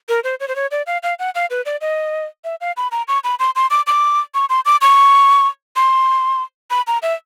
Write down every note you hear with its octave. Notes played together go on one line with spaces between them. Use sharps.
A#4
C5
C#5
C5
C#5
D5
F5
F5
F#5
F5
B4
D5
D#5
E5
F5
B5
A#5
C#6
B5
C6
C6
D6
D6
C#6
C6
D6
C#6
C6
B5
A#5
E5